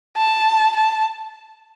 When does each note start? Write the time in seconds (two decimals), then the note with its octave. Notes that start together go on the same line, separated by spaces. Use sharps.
0.17 A5
0.76 A5